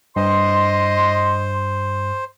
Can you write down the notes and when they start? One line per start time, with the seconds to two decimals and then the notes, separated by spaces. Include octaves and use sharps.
0.16 G2 C5 D#5 C6